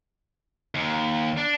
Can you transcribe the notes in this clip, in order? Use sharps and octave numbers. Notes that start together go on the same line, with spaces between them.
D#2
D4